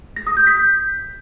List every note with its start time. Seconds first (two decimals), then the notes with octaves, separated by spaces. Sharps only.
0.16 A#6
0.27 D#6
0.37 G6
0.47 B6
0.57 G6